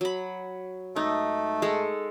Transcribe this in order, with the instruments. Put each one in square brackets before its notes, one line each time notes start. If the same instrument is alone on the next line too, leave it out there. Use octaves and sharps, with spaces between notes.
[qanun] F#3 B5
[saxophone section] G#2 A3 [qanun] D#4
[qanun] G#3 A4